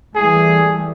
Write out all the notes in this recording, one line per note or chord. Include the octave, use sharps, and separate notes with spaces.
E3 G3 A3 G#4